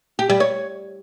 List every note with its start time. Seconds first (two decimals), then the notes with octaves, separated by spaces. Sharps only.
0.19 G4
0.30 G3
0.40 C#5